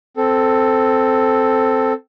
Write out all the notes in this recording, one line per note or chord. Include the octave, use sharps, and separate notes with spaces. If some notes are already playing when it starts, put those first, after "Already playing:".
C4 A4